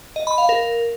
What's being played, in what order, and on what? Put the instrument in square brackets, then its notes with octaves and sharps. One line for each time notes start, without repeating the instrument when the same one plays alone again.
[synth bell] D#5
B5
F5
A#4